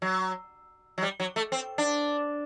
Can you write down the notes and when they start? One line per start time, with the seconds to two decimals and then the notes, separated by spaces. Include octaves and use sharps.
0.02 F#3
0.98 F#3
1.02 G3
1.20 F#3
1.36 A3
1.52 C4
1.78 D4